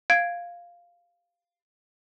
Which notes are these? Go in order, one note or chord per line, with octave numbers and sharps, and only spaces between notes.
F5 G#6 D7